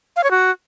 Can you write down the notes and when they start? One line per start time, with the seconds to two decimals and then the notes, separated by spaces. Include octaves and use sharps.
0.16 F5
0.24 C#5
0.31 F#4